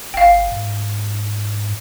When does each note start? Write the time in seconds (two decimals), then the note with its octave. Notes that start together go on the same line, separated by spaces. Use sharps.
0.14 G1 F5 G5
0.51 G#2